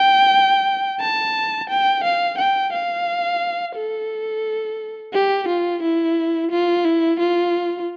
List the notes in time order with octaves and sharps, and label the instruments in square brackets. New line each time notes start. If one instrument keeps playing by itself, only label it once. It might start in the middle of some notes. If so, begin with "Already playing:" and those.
Already playing: [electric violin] G5
A5
G5
F5
G5
F5
A4
G4
F4
E4
F4
E4
F4